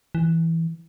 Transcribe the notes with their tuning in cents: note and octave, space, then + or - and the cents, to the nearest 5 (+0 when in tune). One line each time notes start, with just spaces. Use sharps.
E3 -5